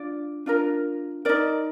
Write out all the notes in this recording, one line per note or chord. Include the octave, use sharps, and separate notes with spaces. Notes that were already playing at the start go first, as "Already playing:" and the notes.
Already playing: D4 F4 D5
D4 F4 A#4
D#4 A#4 D5